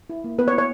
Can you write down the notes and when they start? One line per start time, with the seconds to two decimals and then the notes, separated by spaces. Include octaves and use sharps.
0.10 E4
0.24 A#3
0.38 B3 B4
0.48 C#5
0.53 E4
0.58 C#5